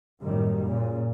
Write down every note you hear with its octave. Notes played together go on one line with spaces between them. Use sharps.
F#1 A2 D#3 G3
A#2 C#3